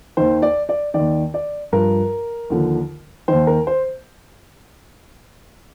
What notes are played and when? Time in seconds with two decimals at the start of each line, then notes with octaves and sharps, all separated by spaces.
0.17 D#2 D#3 C5
0.42 D5
0.69 D5
0.94 D#2 D#3 D5
1.34 D5
1.72 G2 F3 A#4
2.50 D#2 D3 F3
3.28 D#2 D#3 C5
3.47 A#4
3.67 C5